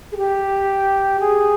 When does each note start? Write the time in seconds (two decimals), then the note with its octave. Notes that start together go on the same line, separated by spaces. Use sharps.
0.12 G#4
0.17 G4
1.20 G#4